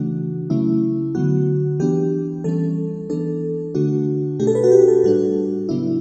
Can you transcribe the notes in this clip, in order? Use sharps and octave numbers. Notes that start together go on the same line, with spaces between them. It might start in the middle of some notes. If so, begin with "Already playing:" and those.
Already playing: C#3 E3 A3 D4 F#4
C#3 F#3 A3 C#4 E4
D3 F#3 B3 F#4
E3 B3 D4 G4
E3 G3 C#4 A4
E3 B3 D4 A4
D3 A3 D4 F#4
B2 A3 D4 G4
A4
B4
F#4
G4
A4
A2 G3 D4 F#4
C#3 F#3 B3 D4 E4